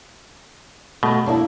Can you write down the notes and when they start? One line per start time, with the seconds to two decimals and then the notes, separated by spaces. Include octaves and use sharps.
1.03 B2 A3
1.26 A#3 D4 E4